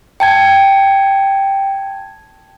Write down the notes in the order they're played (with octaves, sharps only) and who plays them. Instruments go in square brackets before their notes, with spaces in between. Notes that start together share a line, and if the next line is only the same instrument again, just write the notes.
[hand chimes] G5 A5 G#6